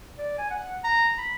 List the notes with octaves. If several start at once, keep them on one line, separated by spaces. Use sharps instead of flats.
D5
G#5
F#5
A#5
B5